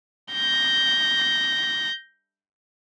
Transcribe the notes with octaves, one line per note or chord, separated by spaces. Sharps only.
G6 A#6